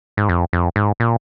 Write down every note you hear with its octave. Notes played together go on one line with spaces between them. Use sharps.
G#2
F2
F2
G#2
A#2